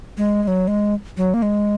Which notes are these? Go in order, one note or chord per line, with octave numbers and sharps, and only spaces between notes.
G#3
G#3
F#3
G#3
F#3
A#3
G#3